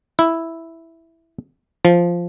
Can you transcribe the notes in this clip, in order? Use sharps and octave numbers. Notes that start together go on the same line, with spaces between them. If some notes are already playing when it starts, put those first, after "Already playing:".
E4
F3